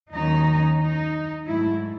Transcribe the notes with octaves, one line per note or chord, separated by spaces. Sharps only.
D#2 D#3 F#3 C#4 D#4
D#4
G#2 F#3 A3 E4